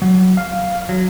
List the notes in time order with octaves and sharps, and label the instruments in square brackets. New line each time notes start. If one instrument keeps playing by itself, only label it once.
[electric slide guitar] F#3
F5
F#3